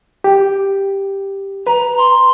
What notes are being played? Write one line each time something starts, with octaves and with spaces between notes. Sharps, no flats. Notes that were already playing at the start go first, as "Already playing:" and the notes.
G4
B4 A#5
C6